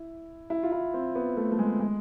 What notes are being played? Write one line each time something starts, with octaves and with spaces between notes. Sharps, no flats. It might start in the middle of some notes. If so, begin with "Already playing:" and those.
Already playing: E4
E4
F4
E4
C4
B3
A3
A3
G#3
G#3